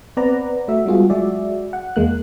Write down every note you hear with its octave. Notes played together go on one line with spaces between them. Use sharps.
B3 C4 B4 D5 F#5 A#5
A3 F#4 E5
G3 G#3 B3 F4 F#4 G#4
F#3 G#3 F#4 G#4 D5 E5
F#5
E2 G#3 A#3 F#6